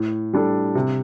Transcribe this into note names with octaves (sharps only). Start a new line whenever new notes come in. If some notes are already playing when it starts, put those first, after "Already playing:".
Already playing: A2
G3 D4 A4
C3